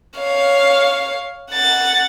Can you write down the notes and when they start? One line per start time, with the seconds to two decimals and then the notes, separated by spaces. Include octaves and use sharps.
0.18 C#5 F5
1.52 F#5 A6